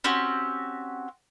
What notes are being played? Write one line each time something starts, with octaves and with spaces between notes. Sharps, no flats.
C4 C#4 F#4 G4